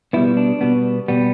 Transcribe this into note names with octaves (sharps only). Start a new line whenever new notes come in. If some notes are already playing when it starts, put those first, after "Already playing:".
B2 G3 B3 E4
D4
B2 G3 B3
B2 G3 B3